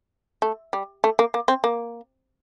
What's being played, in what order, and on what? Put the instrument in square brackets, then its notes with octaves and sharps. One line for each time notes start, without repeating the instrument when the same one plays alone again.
[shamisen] A3
G3
A3
A#3
A#3
C4
A#3